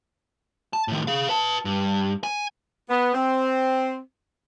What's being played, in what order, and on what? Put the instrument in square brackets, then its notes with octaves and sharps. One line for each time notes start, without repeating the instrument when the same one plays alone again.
[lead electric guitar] A5
A2 D#3
G#4 F5
B4 A5
G2
G#5
[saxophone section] B3
C4